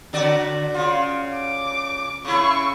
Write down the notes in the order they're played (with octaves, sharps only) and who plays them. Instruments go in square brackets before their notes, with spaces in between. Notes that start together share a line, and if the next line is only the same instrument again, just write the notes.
[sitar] D3 F#4 D5
C#3 F4
[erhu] D6
[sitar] C#3 E4 [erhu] C#6